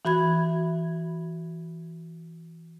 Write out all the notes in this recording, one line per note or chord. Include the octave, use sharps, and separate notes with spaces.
E3 F#4 B5 G#6